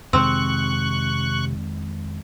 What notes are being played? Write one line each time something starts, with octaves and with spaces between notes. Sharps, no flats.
F2 C3 D#3 G#3 C4 C#6 F#6